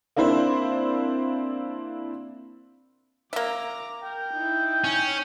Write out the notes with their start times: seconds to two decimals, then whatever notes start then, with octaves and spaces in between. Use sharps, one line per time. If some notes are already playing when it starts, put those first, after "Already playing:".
0.16 A#3 C4 D4 E4 C5
3.33 A#3 E5 A#5 D6
4.04 A#4 G5
4.33 D#4 E4
4.84 C#4